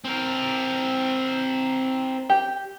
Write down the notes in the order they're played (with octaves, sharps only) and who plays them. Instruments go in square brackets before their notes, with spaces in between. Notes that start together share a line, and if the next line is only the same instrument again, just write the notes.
[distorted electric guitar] C4 A#4
[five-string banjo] G4